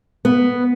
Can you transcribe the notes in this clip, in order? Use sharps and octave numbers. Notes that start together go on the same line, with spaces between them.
B3